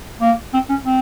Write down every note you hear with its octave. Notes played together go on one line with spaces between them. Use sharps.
A#3
C4
C#4
C4